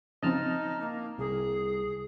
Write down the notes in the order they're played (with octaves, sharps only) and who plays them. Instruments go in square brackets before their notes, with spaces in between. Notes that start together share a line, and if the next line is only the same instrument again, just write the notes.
[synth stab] C#3 F3 C4 [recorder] D#4 [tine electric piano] D#5 A5 F6
[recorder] A#3
[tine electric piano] C2 [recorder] G#4